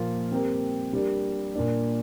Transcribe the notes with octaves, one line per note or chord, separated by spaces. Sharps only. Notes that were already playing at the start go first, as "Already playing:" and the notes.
Already playing: A#2 F3 A#3 F4
G3 C4 G4 A#4
G3 D4 A#4
A#2 A#3 D4